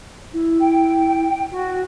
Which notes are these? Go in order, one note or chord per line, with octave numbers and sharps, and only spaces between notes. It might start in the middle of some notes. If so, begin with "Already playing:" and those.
E4
G5
F#4